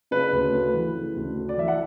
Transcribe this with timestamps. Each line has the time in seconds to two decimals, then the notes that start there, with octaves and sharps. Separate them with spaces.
0.11 C#3 B4
0.33 D2
0.53 A3
0.74 E3
0.95 C#3
1.16 D2
1.37 A3
1.49 D5
1.57 E3 E5
1.68 F#5